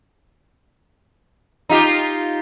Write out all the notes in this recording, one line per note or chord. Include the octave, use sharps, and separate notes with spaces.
D#4 F4 G4